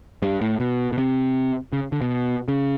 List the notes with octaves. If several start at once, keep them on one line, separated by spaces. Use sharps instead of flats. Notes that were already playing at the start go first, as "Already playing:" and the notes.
G2
A2
B2
B2
C3
C#3
D3
B2
C#3